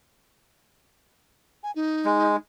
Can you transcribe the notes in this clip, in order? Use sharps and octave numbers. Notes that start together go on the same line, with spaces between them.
G#5
D#4
G#3